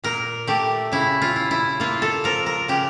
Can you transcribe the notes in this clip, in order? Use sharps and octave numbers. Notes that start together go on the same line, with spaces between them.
A#2 A#4
A3 G4
C#3 E4
F4
E4
E4
A#3 F4
A4
F3 A#4
A#4
C#3 G4